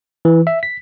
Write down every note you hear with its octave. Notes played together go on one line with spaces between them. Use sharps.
E3
E5
B6